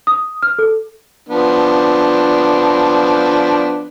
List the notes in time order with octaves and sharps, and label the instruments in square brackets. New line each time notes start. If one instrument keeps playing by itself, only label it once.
[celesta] D#6
F6
A4
[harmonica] F3 B3 D4